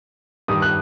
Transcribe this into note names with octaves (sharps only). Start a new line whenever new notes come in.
G2 D#3 G3 D#6
F#6